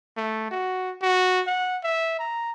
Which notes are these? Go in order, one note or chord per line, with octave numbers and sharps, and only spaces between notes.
A3
F#4
F#4
F#5
E5
A#5